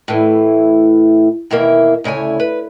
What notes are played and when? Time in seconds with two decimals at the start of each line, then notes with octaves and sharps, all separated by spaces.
0.08 A2 E3
1.51 D#2 B2 E3 A#3 E5
2.04 D2 C#3 E4 C#5 G#5
2.40 B4